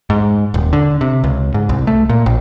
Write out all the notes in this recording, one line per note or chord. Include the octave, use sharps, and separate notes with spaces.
G#2
D#1
D3
C3
C#2
G#2
C2
A3
A#2
A#1